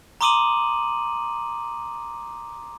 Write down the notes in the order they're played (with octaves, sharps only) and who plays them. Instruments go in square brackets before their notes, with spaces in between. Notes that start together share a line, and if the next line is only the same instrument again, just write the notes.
[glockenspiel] A#5 C6 D6 D#6 D#7 F#7